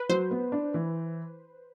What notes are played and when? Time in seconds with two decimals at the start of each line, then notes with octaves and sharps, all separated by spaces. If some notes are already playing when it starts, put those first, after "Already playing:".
Already playing: B4
0.09 F#3 C5
0.31 B3
0.52 D4
0.74 E3